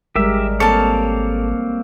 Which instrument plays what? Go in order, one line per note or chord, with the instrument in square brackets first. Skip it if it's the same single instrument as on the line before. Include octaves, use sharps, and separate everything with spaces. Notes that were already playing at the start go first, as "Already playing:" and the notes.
[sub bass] G#1 [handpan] G3 G#3 A#4 [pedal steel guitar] G4 E5
[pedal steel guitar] A#3 C4 C#5 [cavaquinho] A4 A5